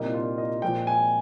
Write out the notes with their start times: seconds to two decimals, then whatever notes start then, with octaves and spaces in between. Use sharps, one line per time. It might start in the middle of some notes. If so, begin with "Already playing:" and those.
Already playing: C2 A#2 G3 A#3 D#4
0.14 F4
0.38 D#5
0.62 A#2 F3 G#3 G5
0.87 G#5